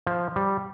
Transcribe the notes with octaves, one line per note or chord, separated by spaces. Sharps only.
F3
G3